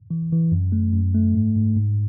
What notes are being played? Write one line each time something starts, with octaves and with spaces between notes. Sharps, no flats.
E3
E3
F#2
A3
F#2
A3
G#2
G#2
G#2